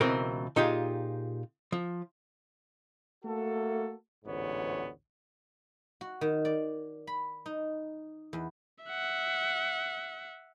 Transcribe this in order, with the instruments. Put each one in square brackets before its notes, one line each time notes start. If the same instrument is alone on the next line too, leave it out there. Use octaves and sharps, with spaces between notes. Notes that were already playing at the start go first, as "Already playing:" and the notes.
[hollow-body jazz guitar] C#2 B2 E3 C4 A#4 A#5
A#2 D#4 F4 G4 G#4
F3
[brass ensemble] A3 A#3 F#4 A4
A1 D2 G#2 B3 C#5
[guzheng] F#4
D#3
D5
B5
D#4
E2
[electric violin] E5 F#5